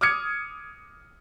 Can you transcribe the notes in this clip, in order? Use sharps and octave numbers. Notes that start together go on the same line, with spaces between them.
D6 D#6 F6 G#6 C#7